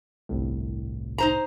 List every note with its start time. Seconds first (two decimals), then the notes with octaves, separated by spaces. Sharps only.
0.29 G1 C2 A2
1.18 D#4 C5 A#5